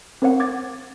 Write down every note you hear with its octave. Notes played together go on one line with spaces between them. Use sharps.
C4 A#4 C5 C#5 F5 F#5
D6 G#6 A6